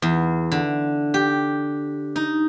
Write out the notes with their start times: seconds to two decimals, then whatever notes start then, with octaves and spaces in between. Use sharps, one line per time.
0.02 E2
0.52 D3
1.14 G4
2.16 D#4